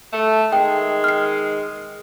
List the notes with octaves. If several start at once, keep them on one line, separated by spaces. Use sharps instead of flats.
A3
D#3 G#3 G5
F6 C7